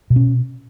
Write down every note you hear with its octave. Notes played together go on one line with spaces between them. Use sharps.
B2
C#4